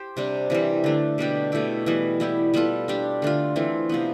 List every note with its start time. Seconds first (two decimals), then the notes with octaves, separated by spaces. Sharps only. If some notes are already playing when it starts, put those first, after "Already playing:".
Already playing: G4 C5
0.17 C3 G3 D4
0.50 C3 E3 G3
0.84 D3 A3 D4
1.18 B2 G3 D4 G4
1.52 B2 A3 E4 G4
1.86 E3 G3 B3
2.20 G3 B3 E4 G4
2.54 G3 B3 F4 A4
2.88 G3 D4 G4
3.22 D3 A3 D4 F4
3.56 E3 A3 C4 F4
3.89 C3 F3 B3